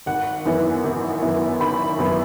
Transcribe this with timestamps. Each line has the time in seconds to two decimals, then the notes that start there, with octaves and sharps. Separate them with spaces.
0.06 G#1 F#5
0.45 F#2 E3 B3 E4
0.84 G#1
1.22 F#2 E3 B3 E4
1.60 G#1 B5
1.99 F#2 E3 B3 E4